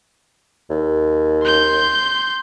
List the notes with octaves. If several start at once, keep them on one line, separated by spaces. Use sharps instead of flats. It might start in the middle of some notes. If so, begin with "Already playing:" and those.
D#2
C6 G6